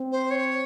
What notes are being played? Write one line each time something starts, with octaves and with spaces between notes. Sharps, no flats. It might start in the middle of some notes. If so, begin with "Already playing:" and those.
Already playing: C4
C5
C#5